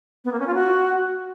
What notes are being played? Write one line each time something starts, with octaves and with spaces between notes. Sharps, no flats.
B3
A#3
C#4
F4
F#4